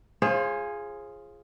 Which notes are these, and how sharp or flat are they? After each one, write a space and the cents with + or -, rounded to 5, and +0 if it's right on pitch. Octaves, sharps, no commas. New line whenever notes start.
F4 -10 G#4 +0 C5 +40